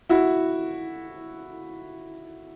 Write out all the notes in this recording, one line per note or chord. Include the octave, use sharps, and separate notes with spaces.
E4 F#4